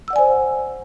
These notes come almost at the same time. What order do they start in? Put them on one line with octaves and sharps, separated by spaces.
E6 F#5 D5 G#5 C5